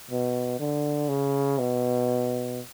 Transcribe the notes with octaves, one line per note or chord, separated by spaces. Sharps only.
B2
D3
C#3
B2